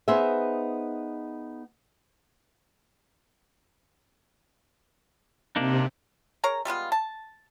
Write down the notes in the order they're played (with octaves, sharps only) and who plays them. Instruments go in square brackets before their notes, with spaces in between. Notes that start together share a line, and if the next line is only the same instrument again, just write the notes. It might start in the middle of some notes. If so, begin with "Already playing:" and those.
[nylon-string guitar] B3 D#4 G#4 C5 E5
[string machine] C3 [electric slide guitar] A#3 D4 D#4
[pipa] G#4 A#4 C#5 A#5
G3 G#3 B3 F4
A5